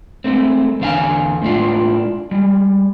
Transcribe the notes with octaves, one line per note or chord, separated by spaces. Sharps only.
G#3 A3 C4
E2 D3 F5 G#5
A2 G#3 D4 F4
G3 G#3